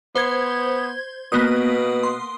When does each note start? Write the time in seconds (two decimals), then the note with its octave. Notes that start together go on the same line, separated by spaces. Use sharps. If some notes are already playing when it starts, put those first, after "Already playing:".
0.16 B3 C5 G#6
1.32 B2 A#3 B3 D#6
2.03 C6